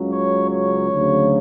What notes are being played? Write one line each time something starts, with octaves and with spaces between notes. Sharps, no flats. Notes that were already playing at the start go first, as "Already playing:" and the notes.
Already playing: C#2 C#3 F#3
C#5
C#5
D2 C#3 F#3